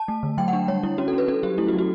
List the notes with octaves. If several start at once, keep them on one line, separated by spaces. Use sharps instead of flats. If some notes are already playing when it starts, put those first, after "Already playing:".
Already playing: A5
A3
D3
F#3 G5
F#5
D4
G3 C#5
G3 E4
C#4 F#4
A4
C#4 B4
C#4 A4
F#3 G4
A3 E4
F#4
F#3
F#4